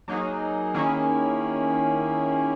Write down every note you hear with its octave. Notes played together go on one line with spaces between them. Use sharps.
F#3 A#3 D#4 G#4
D#3 A#3 C#4 E4 G#4